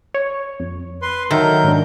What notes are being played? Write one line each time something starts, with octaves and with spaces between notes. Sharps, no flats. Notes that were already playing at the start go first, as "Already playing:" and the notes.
C#5
F2
B4 C6
D#3 F#3 A4 A#4 E5 G6
G#2 D4